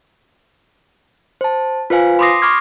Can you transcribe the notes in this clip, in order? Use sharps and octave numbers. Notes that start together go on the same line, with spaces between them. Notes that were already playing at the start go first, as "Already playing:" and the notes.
C5 A5
F4 B4 C5 F5 G#5
B5 C6 D6 D#6 A#6 C7
B5 C#6 D6 F6 G#6 C7